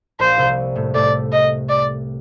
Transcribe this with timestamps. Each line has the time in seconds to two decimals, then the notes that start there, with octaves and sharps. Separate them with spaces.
0.19 A#1 A#2 C5
0.38 C2 C3
0.76 A2 A3
0.94 A2 A3 D5
1.32 D#5
1.69 D5